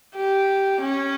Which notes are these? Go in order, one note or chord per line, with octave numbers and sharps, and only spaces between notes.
G4
C#4